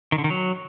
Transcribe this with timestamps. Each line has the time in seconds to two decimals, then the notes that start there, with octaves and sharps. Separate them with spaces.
0.12 D#3
0.18 D3
0.24 D#3
0.30 F#3